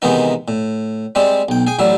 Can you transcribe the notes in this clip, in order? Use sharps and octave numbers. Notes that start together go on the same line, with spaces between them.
C3 D#3 E3 G#3 B3 D#4
A2
G3 G#3 C4 G4
B1 G5
G#4 G5 G#5
A1 F#3 G3 E4